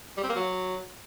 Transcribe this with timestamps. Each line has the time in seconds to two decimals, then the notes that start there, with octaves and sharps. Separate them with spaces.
0.17 G3
0.23 C4
0.29 A#3
0.35 F#3